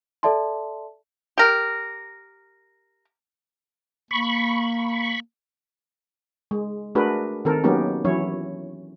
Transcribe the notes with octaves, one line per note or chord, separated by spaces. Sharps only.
A4 D5 E5 A5 C6
G4 A#4
A#3 B5 C#6
G#3
A3 D4 F#4 G#4 A#4 B4
D#3 C4 A4 A#4
F#3 A#3 B3 C#4 D#4 G4
E3 F#3 C#4 E4 C#5